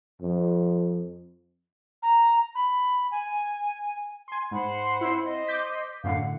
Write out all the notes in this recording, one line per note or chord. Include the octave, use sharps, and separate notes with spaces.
F2
A#5
B5
G#5
G#5 C6
G#2 C5 F#5 B5
C4 E4
C5 D#5
D6 G6 B6
F#2 A2 D3 F5 F#5